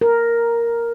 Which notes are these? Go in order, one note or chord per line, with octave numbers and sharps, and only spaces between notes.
A#4